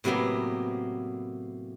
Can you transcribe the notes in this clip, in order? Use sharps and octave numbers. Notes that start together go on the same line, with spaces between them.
A2 C3 F#3 A#3 B3